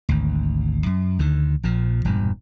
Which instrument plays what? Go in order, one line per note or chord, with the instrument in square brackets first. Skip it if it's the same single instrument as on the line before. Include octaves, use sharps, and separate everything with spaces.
[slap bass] G#1 D2
F#2
D2 D3 D#3
A#1 A#2 F3
E1 G2 A#2